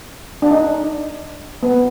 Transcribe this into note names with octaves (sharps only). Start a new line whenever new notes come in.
D4
D#4
B3